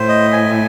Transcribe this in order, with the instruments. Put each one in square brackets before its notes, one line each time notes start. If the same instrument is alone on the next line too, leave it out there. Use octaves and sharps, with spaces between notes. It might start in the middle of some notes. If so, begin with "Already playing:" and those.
Already playing: [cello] A2 [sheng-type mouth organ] C5
[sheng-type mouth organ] D#5
G#5